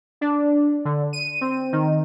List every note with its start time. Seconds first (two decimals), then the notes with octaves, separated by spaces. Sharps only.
0.21 D4
0.85 D3
1.13 D#7
1.41 C4
1.73 D#3